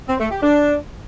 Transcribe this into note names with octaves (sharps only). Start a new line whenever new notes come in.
C4
A3
G4
D4